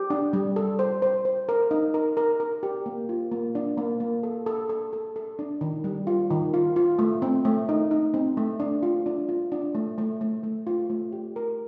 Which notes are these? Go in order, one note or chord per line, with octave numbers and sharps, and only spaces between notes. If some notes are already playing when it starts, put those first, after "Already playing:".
Already playing: G4
D4
G3
A4
C5
C5
C5
A#4
D#4
A#4
A#4
A#4
G4
A#3
F4
A#3
D4
A#3
A#3
A4
A4
A4
A4
A4
D4
D#3
G3
F4
D#3
F4
F4
A3
C4
A3
D#4
D#4
C4
A3
D4
F4
D4
F4
D4
A3
A3
A3
A3
F4
A3
G4
A#4